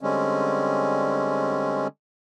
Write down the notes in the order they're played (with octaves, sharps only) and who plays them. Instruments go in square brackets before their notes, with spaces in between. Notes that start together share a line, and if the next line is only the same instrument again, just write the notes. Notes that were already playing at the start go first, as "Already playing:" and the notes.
[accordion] D3 G3 G#3 C4 C#4